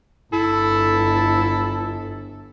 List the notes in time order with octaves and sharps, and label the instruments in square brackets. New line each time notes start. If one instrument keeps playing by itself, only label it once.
[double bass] G1 [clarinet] E4 [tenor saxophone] A4